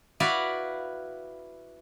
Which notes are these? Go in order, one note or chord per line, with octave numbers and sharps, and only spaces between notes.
E4 F#4 B4 D5 F5